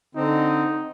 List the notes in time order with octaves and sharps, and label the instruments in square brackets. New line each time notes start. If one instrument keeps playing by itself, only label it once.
[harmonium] D3 C4 [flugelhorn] D#4